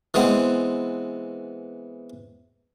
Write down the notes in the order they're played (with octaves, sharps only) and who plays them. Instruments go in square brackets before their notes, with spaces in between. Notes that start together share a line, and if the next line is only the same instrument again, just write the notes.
[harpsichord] E3 G#3 B3 C4